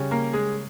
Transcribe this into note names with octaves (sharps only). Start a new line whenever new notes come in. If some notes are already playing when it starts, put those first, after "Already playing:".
Already playing: C#3 G3 C#4
A#3 A#4
G#3 G#4